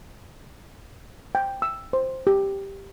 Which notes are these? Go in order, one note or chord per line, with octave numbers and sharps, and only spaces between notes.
G5
E6
C5
G4